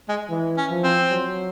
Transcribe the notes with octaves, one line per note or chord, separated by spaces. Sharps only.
G#3
E3
C#4
F3
C4
F#3